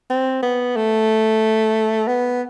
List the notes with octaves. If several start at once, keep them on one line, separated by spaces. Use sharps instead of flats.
C4
B3
A3
B3